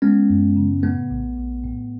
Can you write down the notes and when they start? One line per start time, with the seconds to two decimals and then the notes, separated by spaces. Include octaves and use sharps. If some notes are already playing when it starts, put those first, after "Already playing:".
0.02 G#3 B3 C#4
0.30 F#2
0.56 C#3
0.83 A2 A3 B3
1.10 A#1
1.37 A#1
1.64 A2